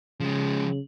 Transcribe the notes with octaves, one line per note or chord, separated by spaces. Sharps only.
C#3 F3 G#3